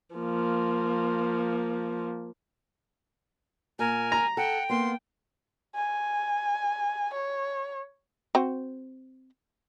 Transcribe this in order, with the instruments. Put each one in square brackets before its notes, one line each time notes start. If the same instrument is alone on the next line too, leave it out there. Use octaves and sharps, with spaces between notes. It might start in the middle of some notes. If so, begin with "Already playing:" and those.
[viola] F3 A#3
[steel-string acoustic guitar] A#2 [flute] A#4 [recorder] G#5
[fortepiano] A#5
[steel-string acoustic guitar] A4 [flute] F#5 [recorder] G5
[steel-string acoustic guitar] A#3 B3 [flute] C6
[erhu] G#5
C#5
[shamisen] C4 F#4 C5